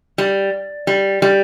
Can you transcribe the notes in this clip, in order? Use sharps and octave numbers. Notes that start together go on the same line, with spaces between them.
G3
G3
G3